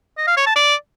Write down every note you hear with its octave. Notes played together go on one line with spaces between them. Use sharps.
D#5
F5
C#5
A5
D5